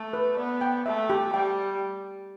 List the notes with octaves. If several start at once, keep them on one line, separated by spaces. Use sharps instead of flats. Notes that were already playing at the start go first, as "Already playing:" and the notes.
Already playing: A3
B4
B3 D5
G5
A3 E5
G4
G3 G5